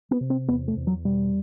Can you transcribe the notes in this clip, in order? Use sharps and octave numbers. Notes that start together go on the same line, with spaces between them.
B3
C3
C4
E2 B3
A3
E2
F#3
B2 G3